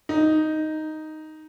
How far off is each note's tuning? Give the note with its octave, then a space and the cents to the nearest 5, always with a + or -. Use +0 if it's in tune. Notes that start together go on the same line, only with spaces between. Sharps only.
D#4 +0